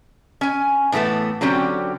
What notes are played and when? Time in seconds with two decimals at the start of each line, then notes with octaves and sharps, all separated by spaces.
0.41 C#4 G#5
0.92 A2 E3 G#3 A3 B3
1.41 D3 F#3 C4 C#4 G4